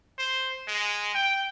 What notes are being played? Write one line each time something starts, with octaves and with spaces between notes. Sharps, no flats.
C5
G#3
G5